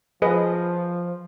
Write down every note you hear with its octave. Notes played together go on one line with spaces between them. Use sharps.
F3 G#4 B4 D#5